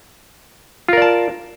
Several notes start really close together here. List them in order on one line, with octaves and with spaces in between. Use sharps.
F4 A#4 D5 A5